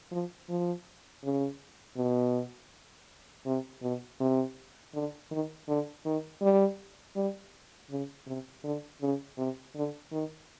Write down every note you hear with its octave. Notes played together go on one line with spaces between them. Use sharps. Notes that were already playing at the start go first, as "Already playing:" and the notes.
F3
F3
C#3
B2
C3
B2
C3
D3
D#3
D3
D#3
G3
G3
C#3
C3
D3
C#3
C3
D3
D#3